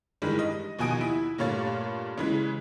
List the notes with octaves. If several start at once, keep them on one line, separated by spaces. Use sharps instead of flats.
G2 D#3 E3 G3 G#3
D#5
D#2 B2 F3 G#5 D#6 D7
E4
G2 A#2 A3 C#5 F5 A6
C#3 E3 G#3